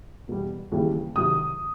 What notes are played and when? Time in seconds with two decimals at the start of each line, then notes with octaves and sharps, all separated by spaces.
0.28 E2 B2 G3
0.72 D#2 C#3 E3 G3
1.16 C2 C3 D#3 F#3 D#6